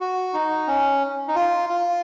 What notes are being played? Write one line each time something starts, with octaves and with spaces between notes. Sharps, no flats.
F#4
D#4
C#4
D#4
F4
F4